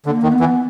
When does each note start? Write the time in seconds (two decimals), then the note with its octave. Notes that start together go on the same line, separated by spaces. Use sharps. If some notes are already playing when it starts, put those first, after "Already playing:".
0.06 D3 A#3
0.23 D#3
0.32 B3
0.40 E3